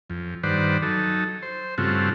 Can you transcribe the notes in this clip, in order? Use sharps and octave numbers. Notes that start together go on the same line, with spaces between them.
F2
G2 D#3 B4 C5 D5 F#5
F#3 D#4 A4
C5
G2 C#3 A3 C4 F4 F#4